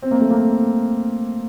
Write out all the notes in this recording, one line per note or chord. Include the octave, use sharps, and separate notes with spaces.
C4
A#3
A3
A#3